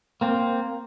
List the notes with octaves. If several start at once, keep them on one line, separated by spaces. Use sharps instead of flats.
A#3 C4